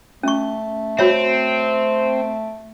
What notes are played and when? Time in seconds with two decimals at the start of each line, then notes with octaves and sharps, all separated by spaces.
0.23 A3 C#4 C#6
0.99 C4 F#4 C#5 E5